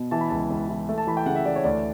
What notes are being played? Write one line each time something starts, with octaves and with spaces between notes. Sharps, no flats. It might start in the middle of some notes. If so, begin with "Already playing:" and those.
Already playing: B2
E3 A5
B5
C#2 A5
C#2
E3
A3
A5
E3 B5
G5
C#3 F#5
E5
E3 D5
C#5
D2 D5